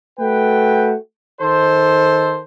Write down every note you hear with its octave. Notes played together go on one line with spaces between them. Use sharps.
A3 F#4 B4 G5
D#3 A4 C5